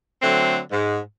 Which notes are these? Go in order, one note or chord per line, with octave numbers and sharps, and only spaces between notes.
D3 F#3 A3 C4
G#2